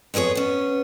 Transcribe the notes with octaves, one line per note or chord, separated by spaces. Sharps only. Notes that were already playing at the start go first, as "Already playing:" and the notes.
F2 B3 C#4 G#4 C#5
B3 C#4